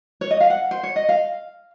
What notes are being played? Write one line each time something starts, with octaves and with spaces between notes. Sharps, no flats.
C#5
D#5
F5
F#5
C5
C#5
D#5
F5